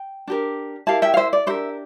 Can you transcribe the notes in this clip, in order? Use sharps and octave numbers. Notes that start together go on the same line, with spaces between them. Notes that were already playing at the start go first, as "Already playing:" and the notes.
Already playing: G5
D4 G4 A#4
E4 G4 A#4 F5 A5
E5 G5
F5
C5 E5
D5
D4 G4 A#4 C5 E5